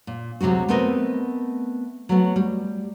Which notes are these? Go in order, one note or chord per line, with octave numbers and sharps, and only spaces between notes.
A#2
D2 C3 F#3 G#3 F#4
A3 B3 C4 A#4 B4 D#5
F#3 A3 B3
G3